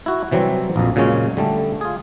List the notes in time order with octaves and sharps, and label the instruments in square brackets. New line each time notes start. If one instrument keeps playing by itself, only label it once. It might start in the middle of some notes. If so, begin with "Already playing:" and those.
[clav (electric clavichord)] E4 F#4
C3 E3 F#3 G3 C4
A#1 F2
A#2 C#3 F#3 G#3 C#4
D3 G3 A3
F4 G#4